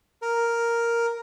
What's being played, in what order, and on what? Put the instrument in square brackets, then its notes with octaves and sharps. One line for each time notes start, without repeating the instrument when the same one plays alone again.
[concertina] A#4